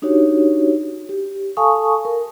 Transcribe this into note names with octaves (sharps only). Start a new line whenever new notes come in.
D4 D#4 F#4 G4 C#5
G4
A4 F5 G#5 A5 C#6 D#6
A#4